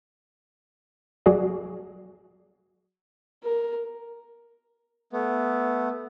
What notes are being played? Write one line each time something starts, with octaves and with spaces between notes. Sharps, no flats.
F#3 F#4 G#4 D5
A#4
A3 B3